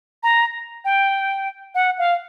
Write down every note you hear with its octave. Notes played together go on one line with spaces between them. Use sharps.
A#5
G5
F#5
F5